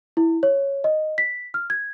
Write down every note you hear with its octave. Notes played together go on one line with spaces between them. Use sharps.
E4
C#5
D#5
B6
F6
G#6